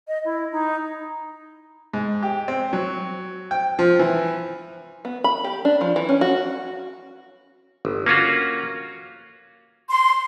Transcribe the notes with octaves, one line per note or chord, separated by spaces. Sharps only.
D#5
E4
D#4
G#2
G4
C4
F#3
G5
F3
E3
B3
B5
G4
D4
F3
E3
C#4
F#4
G1
A#3 C#4 F4 F#4
C6